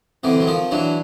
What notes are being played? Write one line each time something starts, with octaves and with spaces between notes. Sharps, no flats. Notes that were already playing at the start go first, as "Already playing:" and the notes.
D3 E3 C4
F#3
D#3 F3
E3 F#3 D4